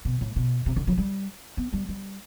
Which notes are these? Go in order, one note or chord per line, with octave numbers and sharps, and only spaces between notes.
B2
A2
B2
C3
D3
F#3
G3
B3
G3
G3